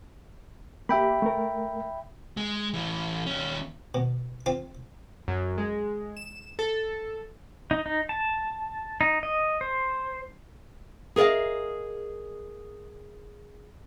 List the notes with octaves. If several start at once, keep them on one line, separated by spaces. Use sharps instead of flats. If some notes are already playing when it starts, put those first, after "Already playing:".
A#3 G4 E5 G5 B5
A3 A#4
G#3
A2 E3
D#2 C#4
B2
C4 F4
F#2
G#3
E7
A4
D#4
D#4
A5
D#4
D#5
C5
G#4 A#4 D5 D#5 F5